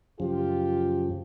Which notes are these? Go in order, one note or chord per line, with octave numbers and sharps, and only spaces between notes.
F#2 C#3 F3 F4 G4